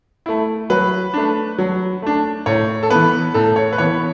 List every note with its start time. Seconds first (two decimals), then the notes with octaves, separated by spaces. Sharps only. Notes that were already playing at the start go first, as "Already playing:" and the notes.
0.26 A3 E4
0.70 F#3 B4
1.14 A3 D4
1.58 F#3
2.02 A3 D4
2.46 A2 C#5
2.83 A4
2.90 E3 B3 B4
3.34 A2 A4
3.56 C#5
3.73 B4
3.78 E3 B3 C#5